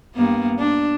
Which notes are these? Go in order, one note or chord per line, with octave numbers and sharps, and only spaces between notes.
G2 A#3 B3
D4